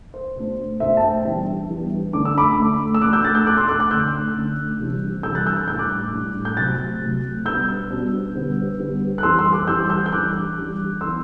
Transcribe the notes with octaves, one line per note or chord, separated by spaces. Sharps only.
C5
B2 A3 D4
B2 A3 D4 C5 E5
A5
E5 G5
E3 G3 B3 D4
E3 G3 B3 D4
D3 A3 D4 D6
E6
B5 D6
D3 A3 D4
E6
B2 A3 D4 D6 F#6
E6 G6
F#6 A6
E6 G6
B2 A3 D4 D6 F#6
C6 E6
D6 F#6
D6 F#6
D3 A3 D4 E6 G6
D3 A3 D4
C3 E3 G3 D4
C3 E3 G3 D4 E6 G6
F#6 A6
E6 G6
F#6
A2 G3 D4 G6
D6 F#6
A2 G3 D4
G6
C3 F#3 A3 F#6 A6
C3 F#3 A3
B2 G3 B3 D4 E6 G6
B2 G3 B3 D4
D3 G3 B3
D3 G3 B3
F#6
E3 G3 C4 C6 E6
C6 E6
D6 F#6
E3 G3 C4 E6 G6
E6 G6
G6
E3 G3 D4 D6 F#6
E3 G3 D4
E3 B3 D4 C6 E6